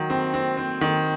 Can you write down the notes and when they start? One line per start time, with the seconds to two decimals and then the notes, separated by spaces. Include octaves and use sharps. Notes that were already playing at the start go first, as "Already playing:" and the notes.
Already playing: D#3 F#3
0.10 C4
0.34 C4
0.57 C4
0.81 D#3